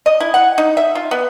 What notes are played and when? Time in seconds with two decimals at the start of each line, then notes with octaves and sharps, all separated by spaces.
0.06 D#5
0.20 E4
0.34 F#5
0.58 D#4
0.77 E5
0.95 F4
1.11 B3